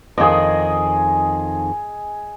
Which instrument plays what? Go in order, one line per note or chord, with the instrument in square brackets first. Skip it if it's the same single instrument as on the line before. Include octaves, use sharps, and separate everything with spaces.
[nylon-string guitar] F2 D#3 [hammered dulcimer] G#4 D#5